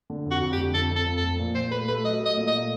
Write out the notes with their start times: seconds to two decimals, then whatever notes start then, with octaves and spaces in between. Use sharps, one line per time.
0.10 D3
0.25 F2
0.31 F#4
0.42 F2
0.53 G4
0.58 D3
0.74 F2 A4
0.91 F2
0.96 A4
1.06 F2
1.17 A4
1.23 F3
1.39 A#2
1.55 A#2 C5
1.71 A3 B4
1.88 A3 B4
2.04 F#3 D#5
2.20 A3
2.26 D#5
2.37 A#2
2.47 D#5
2.53 A3